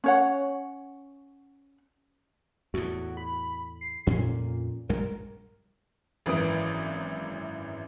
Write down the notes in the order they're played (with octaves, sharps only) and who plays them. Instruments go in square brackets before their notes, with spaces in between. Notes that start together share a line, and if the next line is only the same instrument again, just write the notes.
[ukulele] C#4 C#5 F#5
[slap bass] E2 A2 [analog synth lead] F#4
[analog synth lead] B5
C7
[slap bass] F2 B3 C#4 [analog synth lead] A#2
[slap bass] A#1 G2 G#3 [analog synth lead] A#4
[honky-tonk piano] G#1 F#2 E3 B4 D#6 D7